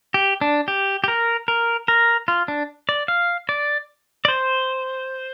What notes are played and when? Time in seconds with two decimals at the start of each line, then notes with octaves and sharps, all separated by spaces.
0.14 G4
0.41 D4
0.68 G4
1.04 G4
1.08 A#4
1.48 A#4
1.88 A#4
2.28 F4
2.48 D4
2.89 D5
3.08 F5
3.49 D5
4.25 D5
4.28 C5